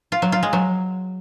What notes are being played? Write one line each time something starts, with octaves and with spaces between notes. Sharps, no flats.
F4
F#3
F4
G#3
F#3